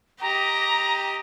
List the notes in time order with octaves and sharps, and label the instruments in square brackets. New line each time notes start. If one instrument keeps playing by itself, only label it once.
[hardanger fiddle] G4 D#5 [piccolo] A#5